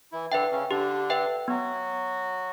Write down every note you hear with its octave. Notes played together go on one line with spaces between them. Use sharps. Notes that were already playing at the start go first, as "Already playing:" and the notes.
E3 E4
D3 D4 B4 E5 G5
C#3 C#4
D3 D4 G4
B4 E5 G5
F#3 B3 F#4